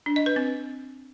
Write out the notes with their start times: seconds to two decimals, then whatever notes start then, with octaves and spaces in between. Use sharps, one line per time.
0.06 D4
0.16 D#5
0.26 B4
0.36 C4